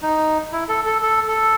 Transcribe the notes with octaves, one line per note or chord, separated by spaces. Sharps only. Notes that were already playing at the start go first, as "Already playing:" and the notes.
D#4
E4
A4
A4
A4
A4